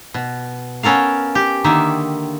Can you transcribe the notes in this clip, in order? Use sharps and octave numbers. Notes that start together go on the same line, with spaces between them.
B2
B3 C#4 A4 A#4 F5
G4
D3 D#3 A#3 D#4 E5